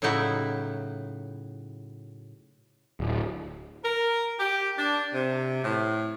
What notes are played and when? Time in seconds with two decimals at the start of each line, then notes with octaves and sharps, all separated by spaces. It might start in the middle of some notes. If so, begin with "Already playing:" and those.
0.02 A2 C#3 F#3 D#4 E4 F#4
3.00 D1
3.84 A#4
4.39 G4
4.78 D4
5.14 C3
5.63 A2